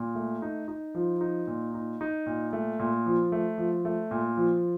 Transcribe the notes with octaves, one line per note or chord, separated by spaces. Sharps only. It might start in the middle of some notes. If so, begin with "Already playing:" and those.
Already playing: A#2
A3
D#4
D#4
F3
D#4
A#2
D#4
D#4
A#2
A3
A#2
F3
A3
F3
A3
A#2
F3